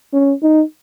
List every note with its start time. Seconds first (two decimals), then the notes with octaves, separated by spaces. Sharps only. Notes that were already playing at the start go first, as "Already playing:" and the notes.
0.13 C#4
0.42 D#4